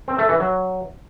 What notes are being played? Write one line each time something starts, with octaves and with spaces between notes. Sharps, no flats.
C4
A3
E3
F#3